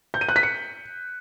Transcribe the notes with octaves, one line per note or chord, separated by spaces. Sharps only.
G6
D#7
F#6
B6
C#7